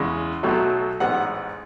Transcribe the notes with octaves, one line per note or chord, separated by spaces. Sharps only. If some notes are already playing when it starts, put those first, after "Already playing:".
Already playing: E2 C#3 G#3
B1 B2 F#3 A3
A1 G#2 G#3 B3 F#5